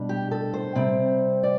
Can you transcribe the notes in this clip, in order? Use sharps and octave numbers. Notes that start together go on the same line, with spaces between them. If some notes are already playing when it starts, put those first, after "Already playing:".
Already playing: B2 G3 D4
G4
A4
C5
C3 G3 C4
D5